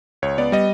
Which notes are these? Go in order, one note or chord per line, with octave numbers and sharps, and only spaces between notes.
C#2 C#5
B3 D5
G3 D#5